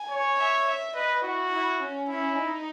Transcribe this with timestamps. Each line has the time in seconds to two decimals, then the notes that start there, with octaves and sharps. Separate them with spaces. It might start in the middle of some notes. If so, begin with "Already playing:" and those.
Already playing: G#5
0.11 C#5
0.39 E5
0.67 E5
0.95 B4 D#5
1.24 E4 F#4
1.53 E4
1.81 C#4
2.09 C#4 E4
2.37 D#4